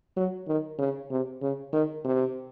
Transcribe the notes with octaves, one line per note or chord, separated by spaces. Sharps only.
F#3
D#3
C#3
C3
C#3
D#3
C3